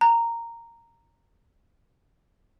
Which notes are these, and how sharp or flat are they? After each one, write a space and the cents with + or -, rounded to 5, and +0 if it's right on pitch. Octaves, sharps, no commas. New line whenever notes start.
A#5 -10